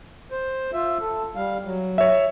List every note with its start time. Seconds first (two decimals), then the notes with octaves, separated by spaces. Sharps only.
0.32 C5
0.73 F4 E5
1.01 A4
1.35 G3 F5
1.65 F#3
1.98 C#5 E5